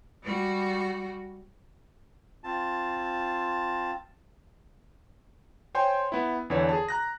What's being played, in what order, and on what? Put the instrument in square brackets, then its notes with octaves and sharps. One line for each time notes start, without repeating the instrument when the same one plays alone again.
[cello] G3 F#4
[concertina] C4 F4 A5
[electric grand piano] C5 C#5 G5 G#5 C6
B3 E4
E2 D3 E3 C#5
G#4 A5
A#5 F#6 A#6